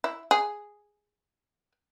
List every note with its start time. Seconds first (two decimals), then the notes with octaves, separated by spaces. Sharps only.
0.04 E4
0.31 G#4